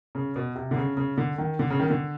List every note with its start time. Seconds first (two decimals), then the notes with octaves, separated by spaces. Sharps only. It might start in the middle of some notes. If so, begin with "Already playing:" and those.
0.15 C#3
0.36 B2
0.56 C3
0.71 D3
0.77 C#3
0.97 C#3
1.18 D3
1.38 D#3
1.59 D3
1.70 C#3
1.80 D#3
1.90 D3